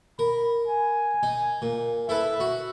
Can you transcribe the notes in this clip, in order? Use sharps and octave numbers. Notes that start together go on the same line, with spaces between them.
A#4 B5
G#5
D#4
A#2
E4 A4 B4 E5
F#4